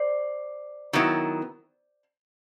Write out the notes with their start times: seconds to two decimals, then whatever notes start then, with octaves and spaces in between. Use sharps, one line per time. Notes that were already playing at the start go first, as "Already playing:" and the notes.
Already playing: C5 D5
0.93 D#3 F#3 B3 E4